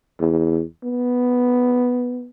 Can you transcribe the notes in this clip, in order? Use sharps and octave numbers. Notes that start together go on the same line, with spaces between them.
E2
B3